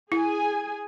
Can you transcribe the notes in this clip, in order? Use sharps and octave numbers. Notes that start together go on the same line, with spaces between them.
E4 G#4 G#5